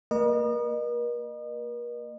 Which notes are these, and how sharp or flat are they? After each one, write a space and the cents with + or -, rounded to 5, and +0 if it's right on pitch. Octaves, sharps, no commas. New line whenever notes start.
A#3 -25 A#4 +45 D#5 -35